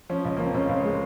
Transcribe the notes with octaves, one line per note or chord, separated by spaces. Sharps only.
F3 C#4
C#2
F3 A#3
C4
C#2 C#4
C#2
G#3